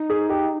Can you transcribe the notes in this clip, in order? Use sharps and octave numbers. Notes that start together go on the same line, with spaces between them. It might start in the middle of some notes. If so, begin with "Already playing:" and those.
Already playing: D#4
G#4
G4